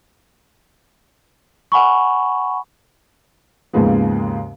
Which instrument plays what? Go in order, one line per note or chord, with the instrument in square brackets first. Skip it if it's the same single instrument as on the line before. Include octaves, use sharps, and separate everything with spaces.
[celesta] F#5 G#5 B5 C#6
[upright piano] D#2 G#2 C#3 F3 G#3 B3